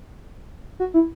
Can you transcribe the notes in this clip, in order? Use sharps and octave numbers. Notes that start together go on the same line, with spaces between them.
F#4
E4